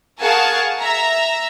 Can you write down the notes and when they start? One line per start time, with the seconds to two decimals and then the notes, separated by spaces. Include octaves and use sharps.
0.19 G#4 A#4 F5 F#5 A5 C#6
0.80 E5 A#5